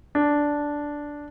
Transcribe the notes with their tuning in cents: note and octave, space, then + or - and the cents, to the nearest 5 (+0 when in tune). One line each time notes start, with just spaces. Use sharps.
D4 -5